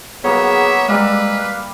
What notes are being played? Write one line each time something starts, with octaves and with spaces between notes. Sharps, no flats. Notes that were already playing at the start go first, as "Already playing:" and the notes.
F#3 A#3 B3 G#4 C#5 E5
G3 G#3 B4 E5 F5 D6